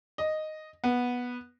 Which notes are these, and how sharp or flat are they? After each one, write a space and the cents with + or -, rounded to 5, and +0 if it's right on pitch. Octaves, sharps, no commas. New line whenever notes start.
D#5 -5
B3 -10